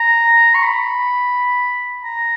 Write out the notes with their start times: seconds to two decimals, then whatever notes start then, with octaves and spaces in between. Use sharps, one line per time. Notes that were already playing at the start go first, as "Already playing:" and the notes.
Already playing: A#5
0.55 C#6
0.63 B5
2.04 A#5